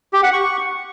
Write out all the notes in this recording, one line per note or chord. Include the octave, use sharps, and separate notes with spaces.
G4
F#5
C#6